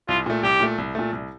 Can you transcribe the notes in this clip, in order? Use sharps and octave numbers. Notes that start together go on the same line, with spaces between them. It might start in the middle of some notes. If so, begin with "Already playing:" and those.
C2 F4
A#2 A3
C2 G4
A#2 A3
C2
A#2 A3
C2